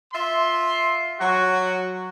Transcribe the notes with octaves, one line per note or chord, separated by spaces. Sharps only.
F4 E5 C6
F#3 F#4